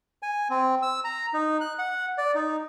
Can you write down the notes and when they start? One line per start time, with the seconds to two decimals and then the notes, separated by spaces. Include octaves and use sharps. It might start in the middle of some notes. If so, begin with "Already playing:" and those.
0.23 G#5
0.50 C4
0.82 E6
1.04 A#5
1.34 D#4
1.61 F#6
1.79 F#5
2.18 D5
2.35 D#4